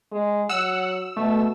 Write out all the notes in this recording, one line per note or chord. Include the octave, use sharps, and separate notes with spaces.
G#3
F#3 F#5 E6
B2 A3